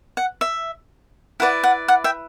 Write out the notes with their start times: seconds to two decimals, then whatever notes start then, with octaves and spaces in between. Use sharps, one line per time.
0.17 F#5
0.41 E5
1.40 E4 B4 D5 F#5
1.64 F#5
1.88 F#5
2.04 E5 G5